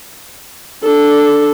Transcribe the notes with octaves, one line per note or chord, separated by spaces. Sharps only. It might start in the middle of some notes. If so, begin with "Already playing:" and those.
D4 A4